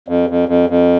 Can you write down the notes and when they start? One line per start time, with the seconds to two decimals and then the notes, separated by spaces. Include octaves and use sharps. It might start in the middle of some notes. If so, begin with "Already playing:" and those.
0.08 F2
0.30 F2
0.49 F2
0.69 F2